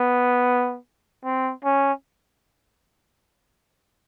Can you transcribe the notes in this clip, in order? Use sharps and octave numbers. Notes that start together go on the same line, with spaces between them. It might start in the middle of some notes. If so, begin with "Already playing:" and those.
Already playing: B3
C4
C#4